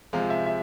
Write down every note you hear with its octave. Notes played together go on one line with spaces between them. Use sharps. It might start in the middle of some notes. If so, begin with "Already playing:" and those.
C3 F3 G#3 F5
E5
E5